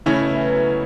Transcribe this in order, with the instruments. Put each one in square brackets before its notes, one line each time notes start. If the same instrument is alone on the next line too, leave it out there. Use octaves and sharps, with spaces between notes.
[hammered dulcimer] A2 [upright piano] C#3 A3 C#4 E4
[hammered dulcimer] B2
E3
F#3